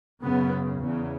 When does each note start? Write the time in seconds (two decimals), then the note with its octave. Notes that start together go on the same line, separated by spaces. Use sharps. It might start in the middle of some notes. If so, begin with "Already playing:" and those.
0.22 F#2 C#3 B3
0.79 E2 C#3